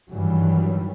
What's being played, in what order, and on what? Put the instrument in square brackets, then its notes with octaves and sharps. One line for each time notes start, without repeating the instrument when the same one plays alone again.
[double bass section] G2 D#3 E3 F#3 G3